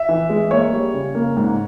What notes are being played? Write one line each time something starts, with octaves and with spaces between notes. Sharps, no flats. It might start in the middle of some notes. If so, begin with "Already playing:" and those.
Already playing: E5
E3
G#3
A#3 C#5
G3
C#3
A#3
G#2